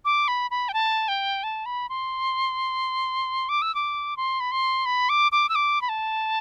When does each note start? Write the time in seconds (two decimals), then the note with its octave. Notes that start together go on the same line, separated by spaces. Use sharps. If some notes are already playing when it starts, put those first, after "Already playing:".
0.05 D6
0.28 B5
0.51 B5
0.69 G5
0.74 A5
1.08 G5
1.43 A5
1.66 B5
1.89 C6
3.49 D6
3.62 E6
3.75 D6
4.17 C6
4.40 B5
4.51 C6
4.86 B5
5.09 D6
5.32 D6
5.49 E6
5.55 D6
5.82 B5
5.89 A5